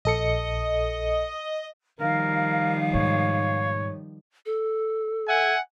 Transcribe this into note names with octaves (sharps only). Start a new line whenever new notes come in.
A#1 A4 D#5 C#7
D#3 F3 G3 A#4 F5
G#2 B2 C#5
A4
E5 F#5 G#5